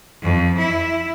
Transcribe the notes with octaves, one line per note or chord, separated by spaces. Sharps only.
F2
E4